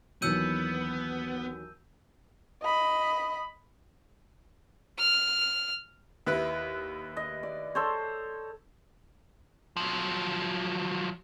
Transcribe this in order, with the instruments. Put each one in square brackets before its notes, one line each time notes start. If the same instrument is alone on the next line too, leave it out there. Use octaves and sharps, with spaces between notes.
[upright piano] D#2 E3 F#3 [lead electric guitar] B3 [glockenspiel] E6 G6 D#7
[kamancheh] D#5 B5
[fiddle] F6
[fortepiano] D#2 E4 B4
[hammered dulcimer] D#5
D5
A4 C5 C#5
[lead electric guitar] F3 F#3